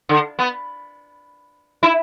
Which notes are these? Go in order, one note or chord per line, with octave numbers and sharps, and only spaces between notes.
D3
B3
E4